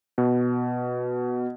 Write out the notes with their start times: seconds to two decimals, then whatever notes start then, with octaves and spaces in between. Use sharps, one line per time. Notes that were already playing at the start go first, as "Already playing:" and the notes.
0.18 B2